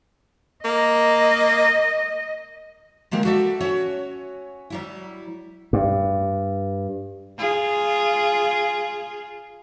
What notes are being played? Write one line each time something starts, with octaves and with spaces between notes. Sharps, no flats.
A#3 D#5
D3 G#3 A#3 G4 A#4
F#4 G4 A4 D5 E5
C#4 F#4 C#5 E5
F#3 G3 E4
G2
F4 G#4